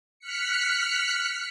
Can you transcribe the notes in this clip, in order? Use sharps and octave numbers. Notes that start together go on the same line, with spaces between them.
F6 F#6 B6 C#7